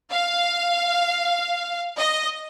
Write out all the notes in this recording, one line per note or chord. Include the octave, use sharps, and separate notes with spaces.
F5
D#5